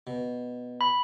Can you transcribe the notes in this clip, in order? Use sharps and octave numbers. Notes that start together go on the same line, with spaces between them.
B2
B5